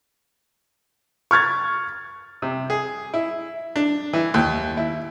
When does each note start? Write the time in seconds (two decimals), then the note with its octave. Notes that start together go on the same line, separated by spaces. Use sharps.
1.31 C#6 F6 G#6 A6
2.42 C3
2.70 G#4
3.14 E4
3.76 D4
4.13 E3
4.34 D#2
4.77 E4